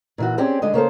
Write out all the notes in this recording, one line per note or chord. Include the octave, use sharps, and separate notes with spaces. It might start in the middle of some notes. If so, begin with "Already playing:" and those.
A#2 E3 F#4
C4 C#4 G4 G#4 D5
D3 G#3 D4 D#5
C#3 A#3 A4 C5